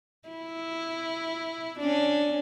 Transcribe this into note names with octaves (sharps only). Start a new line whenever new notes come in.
E4
C#4 D4